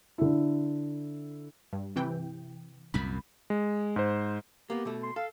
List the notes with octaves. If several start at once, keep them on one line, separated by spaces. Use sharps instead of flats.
D3 E4
G2
C3 E3 G5
C2 F#2 A#2 B5
G#3
G#2 C5
A#3 B3 G4
B2 A3
C6
A4 F5